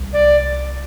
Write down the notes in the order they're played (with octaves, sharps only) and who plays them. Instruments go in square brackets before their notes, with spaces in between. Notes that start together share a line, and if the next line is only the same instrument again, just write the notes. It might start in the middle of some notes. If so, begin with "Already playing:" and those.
Already playing: [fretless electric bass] C2
[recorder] D5